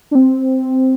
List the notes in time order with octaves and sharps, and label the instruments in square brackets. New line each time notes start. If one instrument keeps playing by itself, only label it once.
[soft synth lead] D4
C4